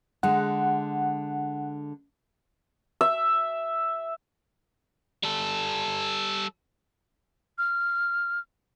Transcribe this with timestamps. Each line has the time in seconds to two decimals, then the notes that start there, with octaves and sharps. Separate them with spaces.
0.23 D3 G#3 F#5
3.01 E5
5.23 G3 A4
7.58 F6